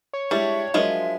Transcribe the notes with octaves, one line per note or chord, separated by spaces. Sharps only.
C#5
G3 G#3 D4 E4 G4 E5
F3 F#3 G#3 D4 F4 A#4 E5